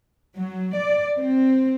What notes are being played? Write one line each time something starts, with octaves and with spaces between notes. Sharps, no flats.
F#3
D5
C4